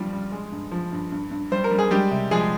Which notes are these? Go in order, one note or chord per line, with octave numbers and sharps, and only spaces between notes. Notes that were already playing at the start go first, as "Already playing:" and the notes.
Already playing: G2 F3 G3 F4
G3
G#3
G2
F3
G2
G2
G2
G3 C5
A#4
G3
G#4
G3 G#3 G4
C3
F3 G#3 G#4